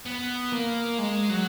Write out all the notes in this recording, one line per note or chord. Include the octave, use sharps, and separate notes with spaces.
B3
A#3
G#3
F#3